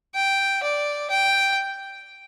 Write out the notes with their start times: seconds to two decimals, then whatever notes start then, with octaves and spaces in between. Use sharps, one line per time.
0.15 G5
0.63 D5
1.10 G5